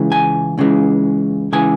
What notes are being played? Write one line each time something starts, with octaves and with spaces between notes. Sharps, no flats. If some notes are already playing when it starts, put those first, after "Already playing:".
Already playing: C#2 C#3 E3 G#3
G#5
C#2 C#3 E3 G#3
C#3 E3 G#3 G#5